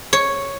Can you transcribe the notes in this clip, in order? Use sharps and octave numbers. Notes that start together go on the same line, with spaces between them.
C#5